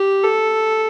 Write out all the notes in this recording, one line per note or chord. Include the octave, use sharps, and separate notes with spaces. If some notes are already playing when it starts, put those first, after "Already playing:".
Already playing: G4
A4